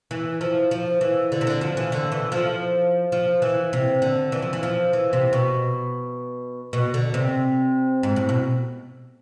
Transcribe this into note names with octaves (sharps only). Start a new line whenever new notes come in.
E3
F3
F3
E3
D3
C3
D3
F3
E3
D3
E3
F3
F3
E3
C3
D3
E3
F3
E3
F3
E3
C3
B2
B2
D3
C3
G#2
A2
B2